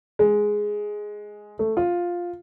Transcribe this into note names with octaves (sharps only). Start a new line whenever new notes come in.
G#3
A3
F4